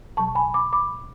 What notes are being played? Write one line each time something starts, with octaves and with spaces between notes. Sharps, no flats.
B2 F#3 A5 C#6
G#5 B5
B5 D6
B5 D6